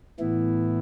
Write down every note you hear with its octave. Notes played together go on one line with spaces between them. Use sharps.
A2 E3 B3 E4